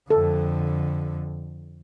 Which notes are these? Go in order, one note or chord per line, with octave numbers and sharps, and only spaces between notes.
F2 D3 A4